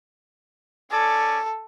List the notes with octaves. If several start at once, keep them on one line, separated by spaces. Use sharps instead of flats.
C#4 A4 D5 G#5